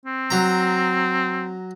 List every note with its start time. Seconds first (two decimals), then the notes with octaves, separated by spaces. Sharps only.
0.06 C4
0.30 F#3 A#5